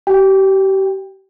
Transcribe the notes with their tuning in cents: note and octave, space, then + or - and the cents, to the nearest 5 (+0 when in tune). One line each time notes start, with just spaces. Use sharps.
G4 -30 G5 +20